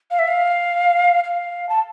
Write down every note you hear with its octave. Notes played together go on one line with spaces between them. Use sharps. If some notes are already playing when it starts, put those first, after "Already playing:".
F5
E5
F5
F5
A5